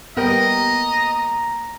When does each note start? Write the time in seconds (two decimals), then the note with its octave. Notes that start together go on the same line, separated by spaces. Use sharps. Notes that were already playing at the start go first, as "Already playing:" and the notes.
0.17 G3 A#3 B3 A#4 D#5 G5 A#5